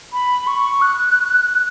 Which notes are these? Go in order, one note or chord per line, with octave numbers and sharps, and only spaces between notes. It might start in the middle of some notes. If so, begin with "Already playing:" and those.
B5
C#6
F#6